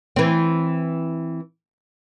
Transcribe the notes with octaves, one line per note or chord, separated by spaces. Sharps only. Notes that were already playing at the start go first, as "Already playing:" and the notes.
E3 C4